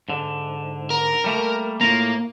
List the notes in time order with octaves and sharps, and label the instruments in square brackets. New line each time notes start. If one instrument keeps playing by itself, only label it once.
[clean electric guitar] G#2 D3
[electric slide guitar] A#4
[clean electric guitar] G3 A3 A#3
[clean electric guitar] A2 F4 A#5 [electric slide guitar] A#3